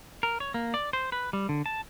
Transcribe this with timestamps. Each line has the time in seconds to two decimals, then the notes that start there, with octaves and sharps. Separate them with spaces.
0.23 A#4
0.40 C#5
0.54 A#3
0.74 D5
0.93 C5
1.12 B4
1.33 G3
1.49 D3
1.66 A5